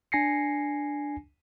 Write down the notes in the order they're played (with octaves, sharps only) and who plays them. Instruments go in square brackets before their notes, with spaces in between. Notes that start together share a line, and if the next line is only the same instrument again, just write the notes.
[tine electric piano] D4 G#5 A#6 C7 C#7